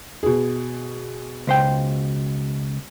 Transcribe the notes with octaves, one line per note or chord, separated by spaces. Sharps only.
B2 G#4
C#2 C5 G5